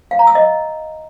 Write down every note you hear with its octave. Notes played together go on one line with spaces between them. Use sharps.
F5
A#5
E6
D#5